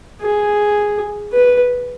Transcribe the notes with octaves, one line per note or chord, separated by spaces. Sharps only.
G#4
B4